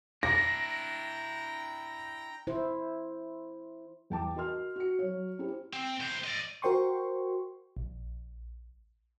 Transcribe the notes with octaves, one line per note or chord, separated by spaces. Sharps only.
D4 E4 G5 A#5 A#6
E4 C5
E2 G5 A5 D6
F#4 A#4 D#5 C6 F6
F#4 C#7
F#3 C#5
C#4 E4 G4 C5
C4
A2 C5
D5 D#5
F#4 A#4 C5 G5 C6 C#6
A#1